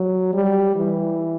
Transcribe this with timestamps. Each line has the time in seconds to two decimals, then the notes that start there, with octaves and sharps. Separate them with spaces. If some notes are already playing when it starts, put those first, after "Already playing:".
Already playing: F#3
0.33 G3
0.76 E3